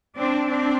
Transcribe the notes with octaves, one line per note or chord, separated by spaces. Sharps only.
C4 D4
C4 D4